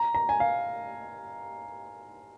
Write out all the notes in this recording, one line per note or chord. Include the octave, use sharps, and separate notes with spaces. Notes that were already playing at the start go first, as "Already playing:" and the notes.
Already playing: A#5
A#5
G#5
F5